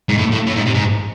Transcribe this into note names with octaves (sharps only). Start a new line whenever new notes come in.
G#2
A2
A2
A2
G#2
C3
G#2